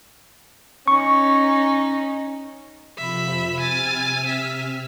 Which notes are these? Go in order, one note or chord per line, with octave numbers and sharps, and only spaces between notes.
C#4 D#4 C#6
F2 C3 F3 E5 B5
C3 G#5 E6 F6 A6
E5